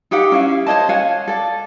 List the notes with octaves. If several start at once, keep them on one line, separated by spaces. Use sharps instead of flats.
D#4 G4 F5 F#5
C#4 E4 F5
C5 C#5 D#5 A5
C#5 F5 F#5 G#5
A4 D5